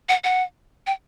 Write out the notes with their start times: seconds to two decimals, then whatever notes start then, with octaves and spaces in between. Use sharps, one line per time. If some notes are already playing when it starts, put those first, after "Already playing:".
0.09 F#5
0.24 F#5
0.87 G5